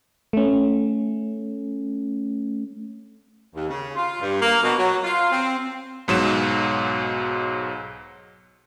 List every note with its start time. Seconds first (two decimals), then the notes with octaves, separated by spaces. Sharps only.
0.33 A3 C#4
3.54 D#2
3.69 C#3
3.95 F4
4.21 G2
4.40 A#3
4.62 B2
4.77 F#3
5.03 F4
5.31 C4
6.08 B1 G#2 F#3 E7